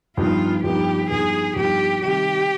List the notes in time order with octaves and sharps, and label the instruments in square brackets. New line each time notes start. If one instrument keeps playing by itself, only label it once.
[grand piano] G2 F3 B3 D#4 [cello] F4
[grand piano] G2 F3 B3 D#4 [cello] G4
[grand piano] G2 F3 B3 D#4 [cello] G#4
[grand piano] G2 F3 B3 D#4 [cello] G4
[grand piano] C3 D#3 G3 [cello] G4